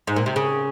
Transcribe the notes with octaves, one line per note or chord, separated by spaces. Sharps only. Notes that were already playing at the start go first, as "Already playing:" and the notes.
G#2
A#2
C3
C#3